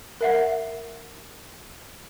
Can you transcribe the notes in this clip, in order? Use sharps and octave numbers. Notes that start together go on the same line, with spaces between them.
A#4 E5 F#5